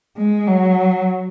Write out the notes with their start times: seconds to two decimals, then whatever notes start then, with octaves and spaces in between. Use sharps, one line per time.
0.17 G#3
0.48 F#3